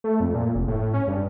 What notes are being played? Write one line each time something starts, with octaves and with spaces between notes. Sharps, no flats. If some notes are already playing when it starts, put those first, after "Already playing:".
A3
F2
A#2
F1
A2
C#4
G2